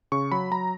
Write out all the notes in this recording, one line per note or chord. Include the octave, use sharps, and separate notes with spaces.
C#3 C#6
F#3 B5
F#3 A#5